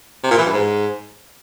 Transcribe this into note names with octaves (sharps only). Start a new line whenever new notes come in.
C3
A#2
E3
G2
G#2